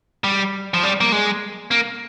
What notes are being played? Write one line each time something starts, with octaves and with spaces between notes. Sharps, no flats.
G3
F3
G3
A#3
G#3
A#3